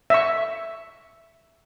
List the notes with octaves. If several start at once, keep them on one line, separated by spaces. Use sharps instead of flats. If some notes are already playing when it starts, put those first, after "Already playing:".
E5 C#6